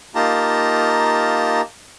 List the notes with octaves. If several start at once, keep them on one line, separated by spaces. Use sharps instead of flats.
A#3 D#4 F4 G4 A5 A#5